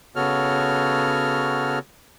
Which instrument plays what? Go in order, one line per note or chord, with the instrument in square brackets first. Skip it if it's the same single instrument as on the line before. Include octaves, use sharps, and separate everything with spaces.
[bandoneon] C#3 B3 F#4 A4 C#5 F6